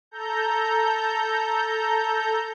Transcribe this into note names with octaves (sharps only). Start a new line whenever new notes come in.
A4 A#5 G6